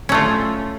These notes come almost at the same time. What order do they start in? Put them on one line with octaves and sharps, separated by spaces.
C#4 A3 F4